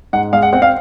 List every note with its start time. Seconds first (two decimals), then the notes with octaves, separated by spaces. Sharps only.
0.13 G#2 F#5
0.33 G#3 F5
0.43 F#5
0.53 C4 F#5
0.62 F5